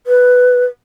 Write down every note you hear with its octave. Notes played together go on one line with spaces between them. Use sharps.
B4